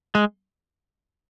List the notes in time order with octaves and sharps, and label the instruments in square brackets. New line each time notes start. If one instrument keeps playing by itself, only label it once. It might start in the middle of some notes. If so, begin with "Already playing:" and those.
[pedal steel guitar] G#3